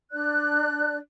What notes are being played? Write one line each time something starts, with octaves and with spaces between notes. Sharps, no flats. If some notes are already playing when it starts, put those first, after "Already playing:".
D4 D5 F#6